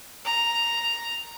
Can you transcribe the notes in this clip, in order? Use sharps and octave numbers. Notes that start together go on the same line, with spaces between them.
A#5